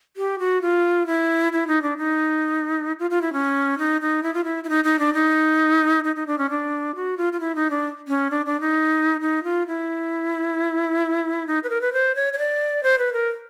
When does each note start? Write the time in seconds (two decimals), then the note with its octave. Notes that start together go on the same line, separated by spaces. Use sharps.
0.17 G4
0.39 F#4
0.62 F4
1.07 E4
1.53 E4
1.67 D#4
1.82 D4
1.97 D#4
2.99 F4
3.10 F4
3.22 E4
3.33 C#4
3.78 D#4
4.01 D#4
4.23 E4
4.34 F4
4.44 E4
4.64 E4
4.69 D#4
4.84 D#4
4.99 D4
5.14 D#4
6.04 D#4
6.16 D#4
6.27 D4
6.38 C#4
6.50 D4
6.95 F#4
7.17 F4
7.33 F4
7.40 E4
7.55 D#4
7.70 D4
8.08 C#4
8.31 D4
8.46 D4
8.61 D#4
9.21 D#4
9.44 F4
9.67 E4
11.47 D#4
11.64 B4
11.70 A#4
11.81 B4
11.93 C5
12.15 C#5
12.33 C#5
12.38 D5
12.83 C5
12.98 B4
13.13 A#4